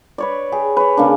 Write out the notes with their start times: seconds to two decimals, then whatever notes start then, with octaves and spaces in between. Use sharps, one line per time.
0.18 B4 C#5 D5
0.52 G4 G#4
0.77 B4 C#5
0.97 C#3 A#3 D4